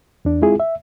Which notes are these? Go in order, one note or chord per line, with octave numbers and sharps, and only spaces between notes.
E2 D4
G#3 C4 E4 F4 G#4
E5